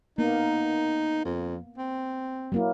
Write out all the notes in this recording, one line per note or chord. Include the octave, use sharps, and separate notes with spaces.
A#3 B3 D#4
F2
C4
F#3 A#3 E4